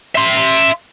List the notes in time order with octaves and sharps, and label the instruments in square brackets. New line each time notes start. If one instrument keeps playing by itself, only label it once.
[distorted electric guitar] E5 C6